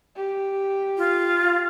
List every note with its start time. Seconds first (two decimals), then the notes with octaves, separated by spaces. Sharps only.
0.17 G4
0.97 F4